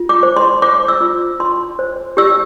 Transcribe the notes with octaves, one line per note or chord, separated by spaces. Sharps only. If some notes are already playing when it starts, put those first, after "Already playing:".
Already playing: F4
D6
C5
C6
C5 D6
E6
F4
F4 C6
C5
G4 E6